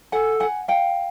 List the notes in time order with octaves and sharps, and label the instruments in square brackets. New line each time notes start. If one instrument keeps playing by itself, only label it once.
[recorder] A4 [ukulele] F#5 G#5
[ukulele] F#5 G#5
F5 G5